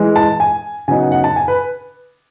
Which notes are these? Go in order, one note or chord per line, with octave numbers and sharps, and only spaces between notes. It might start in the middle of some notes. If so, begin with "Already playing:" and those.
Already playing: E3 G#3
A5
G#5
C#3 F#3 B3 D#4 G#5
F#5
F#5
A5
G#5
B4